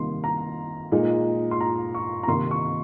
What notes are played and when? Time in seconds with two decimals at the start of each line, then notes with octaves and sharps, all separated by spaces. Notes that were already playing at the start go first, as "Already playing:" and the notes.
Already playing: C3 D#3 G3 A#3 C6
0.24 A#5
0.92 A#2 G#3 D#4
1.51 C6
1.60 A#5
1.94 C#6
2.23 A#5
2.27 C3 D#3 A#3 D#4 C6
2.51 C#6